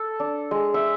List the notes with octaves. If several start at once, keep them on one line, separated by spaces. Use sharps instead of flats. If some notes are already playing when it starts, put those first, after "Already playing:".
Already playing: A4
D4
G#3
E5